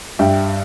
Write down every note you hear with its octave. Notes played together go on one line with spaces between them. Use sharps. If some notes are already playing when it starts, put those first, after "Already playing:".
G2 E5 G5